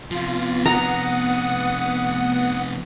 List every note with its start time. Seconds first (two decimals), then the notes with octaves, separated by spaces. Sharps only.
0.11 C3 F3 B3 F4
0.66 F#5 A#5 D#6